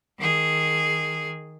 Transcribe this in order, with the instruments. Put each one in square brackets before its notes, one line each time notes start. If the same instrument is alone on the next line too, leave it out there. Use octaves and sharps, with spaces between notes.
[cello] D#3 G#4